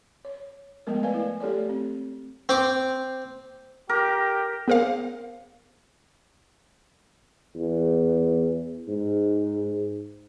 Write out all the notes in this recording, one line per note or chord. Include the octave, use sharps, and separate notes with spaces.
C#5
F3 G#3 A3 B3 A#4
B4 D5 F5 G#5
E4
A3 G4 A4 C#5 D5
C4
C4 D6
G4 A#4
B3 G#4 A#4 C5 F5
E2
G#2